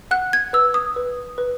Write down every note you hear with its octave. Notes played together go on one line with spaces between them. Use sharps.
F#5 F#6
G#6
B4 E6
D#6
B4
B4